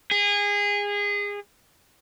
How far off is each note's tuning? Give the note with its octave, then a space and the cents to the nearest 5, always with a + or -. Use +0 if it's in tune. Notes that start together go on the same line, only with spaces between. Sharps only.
G#4 -25